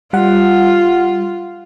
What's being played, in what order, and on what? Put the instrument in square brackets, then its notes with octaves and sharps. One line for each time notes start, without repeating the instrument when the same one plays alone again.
[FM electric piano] G3 F#5 [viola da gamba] F4